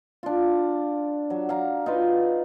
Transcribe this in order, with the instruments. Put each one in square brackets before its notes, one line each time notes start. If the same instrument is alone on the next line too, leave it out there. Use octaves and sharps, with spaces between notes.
[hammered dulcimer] D4 F4
F#3
F5 A#5
D#4 F4 B4